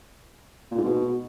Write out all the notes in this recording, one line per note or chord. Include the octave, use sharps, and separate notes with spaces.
A#2
G#2
B2